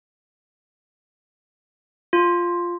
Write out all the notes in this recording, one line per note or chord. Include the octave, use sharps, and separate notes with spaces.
F4